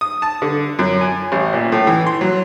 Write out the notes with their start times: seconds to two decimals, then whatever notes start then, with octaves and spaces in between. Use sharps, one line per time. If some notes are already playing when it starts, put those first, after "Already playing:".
0.01 D#6
0.22 A5
0.42 D3
0.79 F#2
1.01 G#5
1.32 A1
1.53 A#2
1.72 A2
1.87 E3
2.07 C6
2.21 F#3